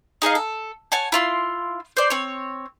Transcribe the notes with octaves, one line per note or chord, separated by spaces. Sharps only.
D#4 G#4 D#5 F5
A4
C#5 F#5 G#5 A5
E4 F4 C6
C5 D5
C4 C#5